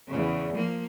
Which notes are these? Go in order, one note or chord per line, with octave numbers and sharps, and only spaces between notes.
E2 C#3
F3 A#3